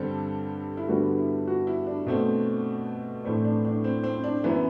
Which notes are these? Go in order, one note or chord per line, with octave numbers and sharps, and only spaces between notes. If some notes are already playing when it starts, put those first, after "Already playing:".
Already playing: G2 D3 G3 C4 A4
E4
G2 D3 G3 B3 F#4
E4
F#4
E4
D4
B2 A3 C4
A2 E3 A3 C4 D4
D4
D4
C4
C4
D4
F#2 E3 B3 E4